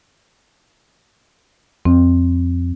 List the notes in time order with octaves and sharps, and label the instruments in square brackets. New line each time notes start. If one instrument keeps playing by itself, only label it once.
[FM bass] F2 [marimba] C4